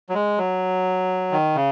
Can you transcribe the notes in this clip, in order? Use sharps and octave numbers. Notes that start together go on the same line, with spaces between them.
F#3
G#3
F#3
D#3
C#3